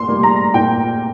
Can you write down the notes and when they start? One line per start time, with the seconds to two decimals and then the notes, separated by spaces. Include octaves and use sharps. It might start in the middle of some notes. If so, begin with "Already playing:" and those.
Already playing: A#2 C6
0.08 G3 A#3
0.23 A#5
0.54 A#2 G5